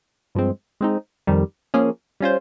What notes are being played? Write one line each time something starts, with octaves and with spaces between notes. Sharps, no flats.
G2 F3 G#3 C4
G#3 C4 D#4
F2 D#3 G3
F3 A#3 C#4 G#4
G3 C#4 F4 C5